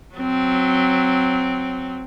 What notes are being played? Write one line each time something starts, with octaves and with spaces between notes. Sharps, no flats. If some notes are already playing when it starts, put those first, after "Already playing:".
F#3 C4